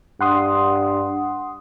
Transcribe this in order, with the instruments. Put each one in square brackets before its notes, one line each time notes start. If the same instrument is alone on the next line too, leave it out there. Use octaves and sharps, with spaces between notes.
[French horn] G2 [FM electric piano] F#5 C6 D#6